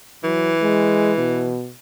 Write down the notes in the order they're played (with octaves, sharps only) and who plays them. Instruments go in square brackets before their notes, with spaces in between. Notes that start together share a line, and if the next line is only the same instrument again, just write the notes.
[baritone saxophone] E3 [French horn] F#3
[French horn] G#3
B2